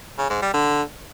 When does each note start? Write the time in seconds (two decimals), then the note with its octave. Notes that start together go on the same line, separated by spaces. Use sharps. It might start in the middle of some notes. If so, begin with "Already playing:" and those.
0.18 C#3
0.30 G#2
0.42 G3
0.54 D3